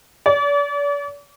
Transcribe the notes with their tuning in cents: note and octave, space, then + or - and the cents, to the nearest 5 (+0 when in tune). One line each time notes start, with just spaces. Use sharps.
D5 -40